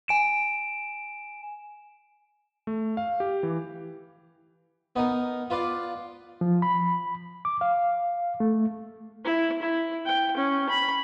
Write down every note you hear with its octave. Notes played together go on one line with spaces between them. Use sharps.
G#5 D7 E7
A3
F5
G4
E3
B3 D#4 A#4
F4 B4 D5 F5
F3
B5
D6
F5
A3
E4
E4
G5
C#4
B5